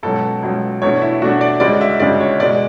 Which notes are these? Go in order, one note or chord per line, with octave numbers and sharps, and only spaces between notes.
C#2 B2 F#3 A4
C#2 B2 F#3
E2 B2 A3 D4 C#5
E4
E2 B2 A3 D4 F#4
D5
D2 C#3 G#3 D5
E5
D2 C#3 G#3 D5
C#5
E2 B2 G#3 D5